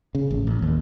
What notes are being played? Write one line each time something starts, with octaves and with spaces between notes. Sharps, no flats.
C#3
A1
A1
D#2